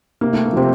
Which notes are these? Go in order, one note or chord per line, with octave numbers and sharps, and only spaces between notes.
C3 A#3
C3 A3
A#3
C3 F3 C4